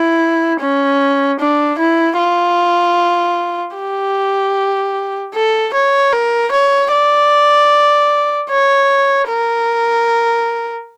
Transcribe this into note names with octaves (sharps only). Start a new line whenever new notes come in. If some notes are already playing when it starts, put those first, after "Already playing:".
Already playing: E4
C#4
D4
E4
F4
G4
A4
C#5
A#4
C#5
D5
C#5
A#4